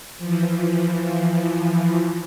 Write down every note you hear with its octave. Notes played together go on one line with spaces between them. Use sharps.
E3 F3